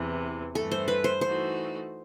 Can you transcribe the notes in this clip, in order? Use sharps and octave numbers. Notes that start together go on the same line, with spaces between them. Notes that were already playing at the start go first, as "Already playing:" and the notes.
Already playing: E2 C3 E3
G2 E3 A3 A4
C5
B4
C5
E3 A3 D#4 F#4 C5